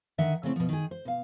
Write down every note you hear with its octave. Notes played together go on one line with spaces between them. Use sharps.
D3 D#3 E5 F#5
C#3 A3 C4 E4
B2 F3
D#3 G#4
C5
B2 F5